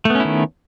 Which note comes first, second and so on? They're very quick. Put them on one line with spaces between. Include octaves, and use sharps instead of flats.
A3 B3 C#4 E4 D#3